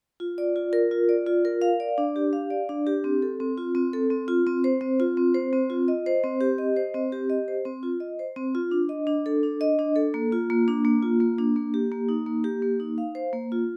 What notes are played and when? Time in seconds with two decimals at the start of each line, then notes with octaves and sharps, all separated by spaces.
0.20 F4
0.38 D5
0.56 F4
0.73 A#4
0.91 F4
1.09 D5
1.27 F4
1.45 A#4
1.62 F5
1.80 D5
1.98 D4
2.16 G4
2.33 F5
2.50 D5
2.69 D4
2.87 G4
3.04 C4
3.22 A4
3.40 C4
3.57 F4
3.75 C4
3.93 A4
4.10 C4
4.28 F4
4.47 C4
4.64 C5
4.81 C4
5.00 F4
5.17 C4
5.34 C5
5.53 C4
5.70 F4
5.88 D#5
6.06 C5
6.24 C4
6.41 G4
6.58 D#5
6.77 C5
6.94 C4
7.12 G4
7.30 D#5
7.48 C5
7.65 C4
7.83 F4
8.00 D#5
8.19 C5
8.36 C4
8.55 F4
8.71 D4
8.89 D#5
9.07 D4
9.26 A4
9.43 D4
9.61 D#5
9.79 D4
9.96 A4
10.14 A#3
10.32 F4
10.50 A#3
10.68 D4
10.85 A#3
11.03 F4
11.20 A#3
11.38 D4
11.56 A#3
11.74 G4
11.92 A#3
12.09 D#4
12.26 A#3
12.44 G4
12.62 A#3
12.80 D#4
12.98 F5
13.15 C5
13.33 A#3
13.52 F4